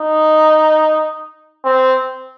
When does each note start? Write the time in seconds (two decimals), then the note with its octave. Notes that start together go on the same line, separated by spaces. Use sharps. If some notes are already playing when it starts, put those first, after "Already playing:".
Already playing: D#4
1.65 C4